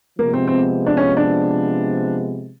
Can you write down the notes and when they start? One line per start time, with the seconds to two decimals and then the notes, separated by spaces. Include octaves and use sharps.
0.19 C3 F3 G#3 A#3 B3
0.33 C4
0.47 C4
0.86 D4
0.97 C#4
1.17 D4